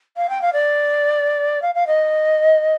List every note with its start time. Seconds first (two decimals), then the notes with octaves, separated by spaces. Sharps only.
0.17 F5
0.29 G5
0.41 F5
0.53 D5
1.62 F5
1.75 F5
1.87 D#5